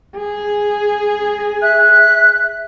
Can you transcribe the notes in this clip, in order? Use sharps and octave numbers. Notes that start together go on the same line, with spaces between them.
G#4
E5 F#6